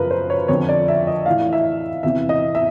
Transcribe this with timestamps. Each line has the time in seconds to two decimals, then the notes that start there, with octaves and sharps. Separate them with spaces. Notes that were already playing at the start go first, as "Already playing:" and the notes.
Already playing: F#2 C#3 F3 A#4 B4
0.11 C5
0.30 C#5
0.48 F2 D3 F3 C#5
0.69 D5
0.88 E5
1.07 D#5
1.26 A2 E3 F5
1.53 E5
2.03 E2 C3 E3 E5
2.29 D#5
2.55 E5